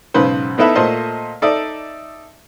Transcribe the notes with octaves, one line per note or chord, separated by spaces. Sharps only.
B1 G#2 C#3 B4 C5
B3 D#4 E4 A4 B4 E5
A#2 A3 C5 D#5 A5
D#4 A4 D5 E5 D#6